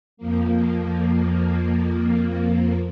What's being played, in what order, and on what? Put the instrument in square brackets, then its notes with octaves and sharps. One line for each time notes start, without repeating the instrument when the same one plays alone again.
[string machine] F2 F3 A#3